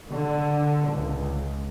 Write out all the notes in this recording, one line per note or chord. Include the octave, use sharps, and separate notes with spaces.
D3
C#2